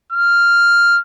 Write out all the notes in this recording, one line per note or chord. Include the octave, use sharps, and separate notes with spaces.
F6